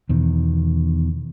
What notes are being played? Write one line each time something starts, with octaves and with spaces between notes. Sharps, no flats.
E2 B2 D#3